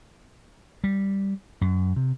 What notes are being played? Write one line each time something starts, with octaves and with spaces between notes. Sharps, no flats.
G3
F#2
C3